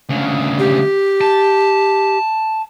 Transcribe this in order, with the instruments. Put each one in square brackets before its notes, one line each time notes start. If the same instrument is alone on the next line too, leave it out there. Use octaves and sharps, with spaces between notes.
[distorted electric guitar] D2 C#3
[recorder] G4
[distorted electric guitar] A5